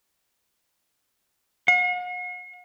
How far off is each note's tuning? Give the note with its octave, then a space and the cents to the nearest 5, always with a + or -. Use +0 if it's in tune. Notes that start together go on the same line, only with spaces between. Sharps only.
F#5 -45